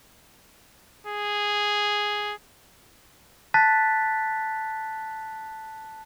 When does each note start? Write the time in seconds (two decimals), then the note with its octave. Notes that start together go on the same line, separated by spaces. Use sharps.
1.06 G#4
3.54 A5 F#6 A6 B6